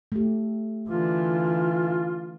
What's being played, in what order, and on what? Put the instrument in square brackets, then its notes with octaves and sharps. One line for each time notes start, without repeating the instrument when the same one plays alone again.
[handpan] A3 G4
[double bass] D3 E3 [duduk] F4